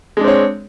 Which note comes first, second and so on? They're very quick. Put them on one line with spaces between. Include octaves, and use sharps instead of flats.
G#3 D4 C4 C#5